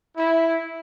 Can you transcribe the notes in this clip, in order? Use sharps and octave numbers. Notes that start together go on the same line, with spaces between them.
E4